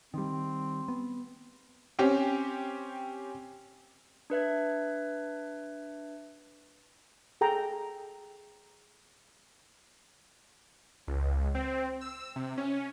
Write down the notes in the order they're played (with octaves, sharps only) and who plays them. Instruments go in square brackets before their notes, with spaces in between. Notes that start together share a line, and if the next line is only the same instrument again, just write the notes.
[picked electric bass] D#3 G3 [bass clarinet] C4
[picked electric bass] B3
[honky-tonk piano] C4 C#4 G4
[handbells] D4 B4 E5 G#6
[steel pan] G#4 A4 G5 A#5
[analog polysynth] C#2
C4
E6
C3
C#4